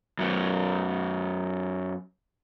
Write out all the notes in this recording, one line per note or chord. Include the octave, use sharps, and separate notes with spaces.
F#2 F#3 B3